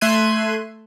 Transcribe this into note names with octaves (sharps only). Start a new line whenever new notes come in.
A3 E5 C6 F#6 G#6 D#7